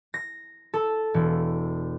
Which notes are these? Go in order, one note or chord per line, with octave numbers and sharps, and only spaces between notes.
A#6
A4
E1